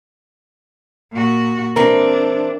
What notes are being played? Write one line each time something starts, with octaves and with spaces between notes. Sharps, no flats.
A#2 F#4
E3 C4 D4 A#4